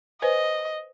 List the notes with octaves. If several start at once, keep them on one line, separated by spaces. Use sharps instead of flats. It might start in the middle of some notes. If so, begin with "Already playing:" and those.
B4 C5 D#5 G#5